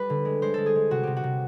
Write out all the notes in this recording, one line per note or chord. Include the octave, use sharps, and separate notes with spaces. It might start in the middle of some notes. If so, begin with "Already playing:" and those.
Already playing: G3 B4
D3
G#3
G#3 C5
G#3 A4
G#4
G#3
C3 F#4
C3 G4
F#4
C3